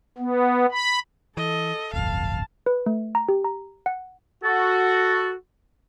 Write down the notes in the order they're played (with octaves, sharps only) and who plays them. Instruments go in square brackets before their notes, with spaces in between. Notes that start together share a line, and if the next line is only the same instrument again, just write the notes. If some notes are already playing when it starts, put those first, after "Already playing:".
[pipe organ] B3
B5
[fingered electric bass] E3 [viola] A4 [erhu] D#5
[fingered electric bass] D1 G1 F2 [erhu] F5 [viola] A5
[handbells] B4
A3
A#5
G4
A#5
F#5
[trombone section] F#4 [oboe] A4